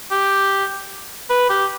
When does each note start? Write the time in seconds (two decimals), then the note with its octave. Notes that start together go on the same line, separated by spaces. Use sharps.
0.11 G4
1.30 B4
1.50 G4